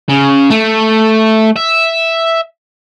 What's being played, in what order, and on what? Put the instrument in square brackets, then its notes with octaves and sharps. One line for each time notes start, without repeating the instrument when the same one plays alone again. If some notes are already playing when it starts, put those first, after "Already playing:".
[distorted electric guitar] C#3
A3
E5